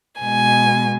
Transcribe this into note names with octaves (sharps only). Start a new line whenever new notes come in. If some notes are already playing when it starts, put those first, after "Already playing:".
B2 G#3 G#5